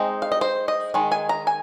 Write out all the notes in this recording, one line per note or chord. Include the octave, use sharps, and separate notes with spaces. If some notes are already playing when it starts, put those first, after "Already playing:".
Already playing: G#3 C4 D#4
F5
D#5
C5
D#5
D#3 G#3
G#5
A#5
G#5